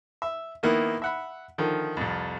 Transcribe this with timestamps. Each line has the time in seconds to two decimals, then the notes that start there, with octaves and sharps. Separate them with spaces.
0.22 E5
0.63 D#3 A#3 B3 E4
1.02 E5 F#5 B5
1.58 D3 D#3 F3
1.97 C2 F2